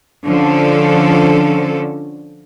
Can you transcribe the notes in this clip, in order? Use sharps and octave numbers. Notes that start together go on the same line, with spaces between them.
D3 F3 C#4 A4